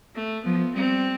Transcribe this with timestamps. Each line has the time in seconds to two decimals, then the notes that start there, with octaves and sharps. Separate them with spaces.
0.15 A3
0.45 F3 B3
0.74 G3 C4